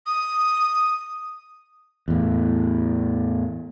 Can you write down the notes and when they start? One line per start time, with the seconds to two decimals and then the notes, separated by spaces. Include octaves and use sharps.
0.06 D#6
2.08 E2 A2